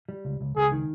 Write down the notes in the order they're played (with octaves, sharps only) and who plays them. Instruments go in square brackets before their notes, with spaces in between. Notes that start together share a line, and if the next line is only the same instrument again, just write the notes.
[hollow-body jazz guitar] G3
C#2
C#2
[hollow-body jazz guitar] C#2 [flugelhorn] G#4
[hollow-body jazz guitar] D#3